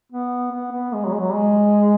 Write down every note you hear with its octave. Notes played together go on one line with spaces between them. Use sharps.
B3
B3
B3
G#3
F#3
G#3
F#3
G#3